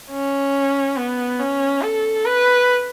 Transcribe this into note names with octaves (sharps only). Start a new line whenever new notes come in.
C#4
B3
C#4
A4
B4